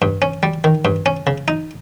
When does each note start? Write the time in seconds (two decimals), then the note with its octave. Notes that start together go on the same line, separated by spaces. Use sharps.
0.02 G2
0.22 C#4
0.43 G3
0.64 D#3
0.85 G2
1.06 C#4
1.27 C#3
1.48 D#4